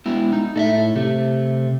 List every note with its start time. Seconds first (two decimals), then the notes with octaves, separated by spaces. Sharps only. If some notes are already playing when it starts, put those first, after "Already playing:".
0.06 G#3 B3 E4
0.33 D#4
0.56 A2 A4 D#5 E5
0.96 C3 A3